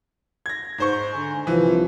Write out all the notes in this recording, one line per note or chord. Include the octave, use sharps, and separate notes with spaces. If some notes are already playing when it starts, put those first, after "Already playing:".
G#6 A#6
G#2 C5 C#6
D3 G#5
C2 E3 F3